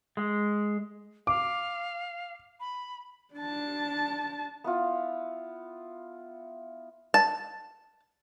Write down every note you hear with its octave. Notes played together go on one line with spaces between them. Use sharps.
G#3
F5 D6
B5
D4 A5
B3 E4 F4
A5